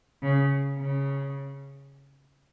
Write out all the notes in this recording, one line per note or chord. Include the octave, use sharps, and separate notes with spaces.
C#3
C#3